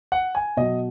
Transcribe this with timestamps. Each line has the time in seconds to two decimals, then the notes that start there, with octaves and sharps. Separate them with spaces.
0.12 F#5
0.35 G#5
0.57 B2 F#3 D#5